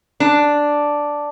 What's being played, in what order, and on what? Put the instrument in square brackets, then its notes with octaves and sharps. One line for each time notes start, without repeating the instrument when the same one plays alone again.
[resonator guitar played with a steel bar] D4